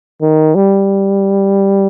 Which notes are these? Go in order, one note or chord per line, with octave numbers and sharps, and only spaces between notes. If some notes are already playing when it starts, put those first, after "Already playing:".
D#3
G3